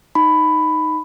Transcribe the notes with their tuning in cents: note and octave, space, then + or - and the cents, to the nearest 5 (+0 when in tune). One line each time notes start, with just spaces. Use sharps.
D#4 +0 B5 +10